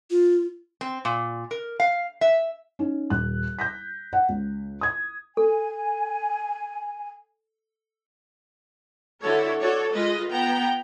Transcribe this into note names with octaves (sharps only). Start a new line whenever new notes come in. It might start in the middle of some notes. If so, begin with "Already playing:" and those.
F4
C4
A#2
A#4
F5
E5
C#4 D#4
D#1 F#6
G6 A#6 B6
F#5
C#2
D#6 G#6
A4 G#5
D3 E4 F#4 A4 C#5
F#4 A4 C#5 D5
G#3 F4 B4 D#5
B3 G5 A#5